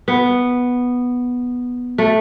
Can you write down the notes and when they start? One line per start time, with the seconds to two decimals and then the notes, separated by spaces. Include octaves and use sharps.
0.08 B3
1.98 A3